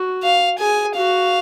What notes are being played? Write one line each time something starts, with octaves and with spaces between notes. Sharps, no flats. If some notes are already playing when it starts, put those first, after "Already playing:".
Already playing: F#4
F5
G#4 G#5
F#4 F5